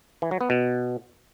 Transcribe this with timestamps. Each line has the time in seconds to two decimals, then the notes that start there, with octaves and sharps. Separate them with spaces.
0.22 E3
0.31 F#3
0.41 B3
0.50 B2